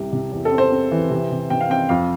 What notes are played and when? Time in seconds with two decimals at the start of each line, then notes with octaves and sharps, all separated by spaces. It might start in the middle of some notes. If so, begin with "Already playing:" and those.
Already playing: C2 C3
0.12 C3
0.32 E2
0.45 A4
0.51 C4
0.58 C5
0.71 C4
0.91 E3
1.10 C3
1.31 C3
1.50 C3 G5
1.61 F5
1.69 C4 G5
1.89 F2 F5